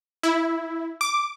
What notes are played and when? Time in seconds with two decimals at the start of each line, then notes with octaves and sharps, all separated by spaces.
0.23 E4
1.01 D6